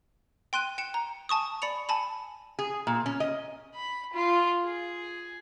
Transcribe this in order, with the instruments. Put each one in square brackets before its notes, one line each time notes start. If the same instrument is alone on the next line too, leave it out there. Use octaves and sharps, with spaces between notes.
[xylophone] G5 C6 F#6 D#7
G5 C#7 E7
A#5
G#5 A5 C#6 D#6
D5 B5 C#7 F7
G#5 A5 B5
[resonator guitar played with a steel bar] G#4
A#2
C#4
D#5
[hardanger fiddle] B5
F4
G#4